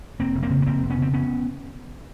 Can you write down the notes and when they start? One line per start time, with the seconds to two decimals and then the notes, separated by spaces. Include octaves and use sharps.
0.19 F1 A#3 C4
0.35 F1
0.43 A#3 C4
0.50 C#3
0.62 B3
0.66 F1 A#3 C4
0.83 F1
0.90 B3 C#4
0.97 C#3
1.02 C4
1.14 B3 C#4